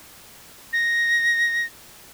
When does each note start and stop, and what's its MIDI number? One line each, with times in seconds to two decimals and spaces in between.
0.73 1.66 94